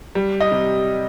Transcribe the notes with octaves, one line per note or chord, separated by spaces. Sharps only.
G3
D#5
C3